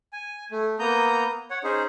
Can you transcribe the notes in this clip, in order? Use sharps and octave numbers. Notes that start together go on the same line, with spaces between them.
G#5
A3
A#3 B3 A#5 D#6 G6
C#5 F#5
C#4 D#4 G#4 C5